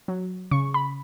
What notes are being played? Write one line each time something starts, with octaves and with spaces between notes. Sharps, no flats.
F#3
C#3 C#6
B5